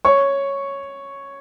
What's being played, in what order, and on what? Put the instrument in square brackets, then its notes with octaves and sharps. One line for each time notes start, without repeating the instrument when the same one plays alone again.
[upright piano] C#5 C#6